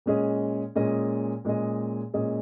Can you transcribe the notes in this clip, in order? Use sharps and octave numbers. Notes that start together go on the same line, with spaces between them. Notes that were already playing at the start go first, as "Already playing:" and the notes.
A#2 G#3 C#4 G#4 D#5
A#2 G#3 C#4 G#4 D#5
A#2 G#3 C#4 G#4 D#5
A#2 G#3 C#4 G#4 D#5